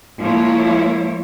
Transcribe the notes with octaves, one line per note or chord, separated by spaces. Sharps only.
F3 G#3 A#3 E4 C#5